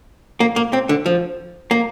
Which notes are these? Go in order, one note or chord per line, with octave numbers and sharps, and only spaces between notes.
A#3
A#3
C4
D3
F3
A#3